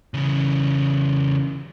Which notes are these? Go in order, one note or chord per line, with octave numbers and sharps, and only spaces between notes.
C#3 E3